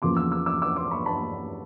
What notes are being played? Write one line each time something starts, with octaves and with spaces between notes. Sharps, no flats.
E2 C#3 F3 A#3 C6 D6
D6 E6
D6 E6
D6 E6
D6 E6
C6 D6
B5 C#6
A5 B5